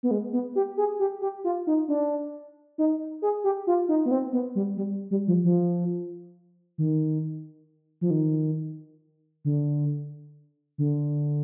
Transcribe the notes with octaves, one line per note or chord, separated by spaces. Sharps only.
B3
G#3
B3
G4
G#4
G4
G4
F4
D#4
D4
D#4
G#4
G4
F4
D#4
B3
C4
B3
G3
G3
G3
F3
F3
D#3
F3
D#3
D3
D3